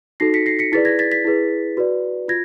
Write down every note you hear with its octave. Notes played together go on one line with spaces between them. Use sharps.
D#4 F#4 A4 A#6 C7
B6 C#7
A#6 C7
B6 C#7
E4 G#4 B4 D5 A6 B6
G#6 A#6
A6 B6
A6 B6
E4 G#4 B4
F#4 B4 D5
F4 G#6 A#6